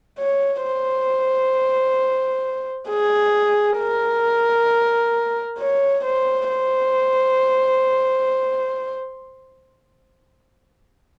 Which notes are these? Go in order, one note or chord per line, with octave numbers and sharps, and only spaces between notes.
C#5
C5
G#4
A#4
C#5
C5
C5